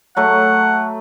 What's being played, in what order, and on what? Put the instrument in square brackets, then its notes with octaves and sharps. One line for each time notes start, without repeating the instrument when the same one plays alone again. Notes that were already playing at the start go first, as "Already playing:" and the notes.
[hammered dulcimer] F#3 A3 [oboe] F#5